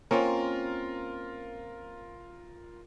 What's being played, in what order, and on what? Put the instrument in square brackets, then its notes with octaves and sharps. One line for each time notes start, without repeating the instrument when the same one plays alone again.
[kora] A#3 C4 C#4 [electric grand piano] F4 A#4